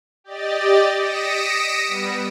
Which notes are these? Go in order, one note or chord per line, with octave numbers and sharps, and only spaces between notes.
G4 D5 D#5 A6
D#6 A#6 B6 C#7 D7 E7
G3 B3